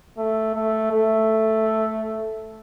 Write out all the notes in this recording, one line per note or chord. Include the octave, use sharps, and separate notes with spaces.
A3
A3
A3